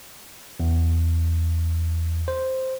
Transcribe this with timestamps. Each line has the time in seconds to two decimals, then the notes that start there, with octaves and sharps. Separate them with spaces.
0.60 E2
2.28 C5